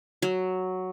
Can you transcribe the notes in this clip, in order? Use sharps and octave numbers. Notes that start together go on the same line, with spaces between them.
F#3